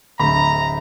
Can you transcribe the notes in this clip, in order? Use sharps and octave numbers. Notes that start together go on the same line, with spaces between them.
D1 D2 A#5 B5